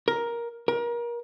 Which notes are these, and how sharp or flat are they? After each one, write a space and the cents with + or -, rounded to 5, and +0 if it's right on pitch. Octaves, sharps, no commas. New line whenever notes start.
A#4 +10
A#4 +30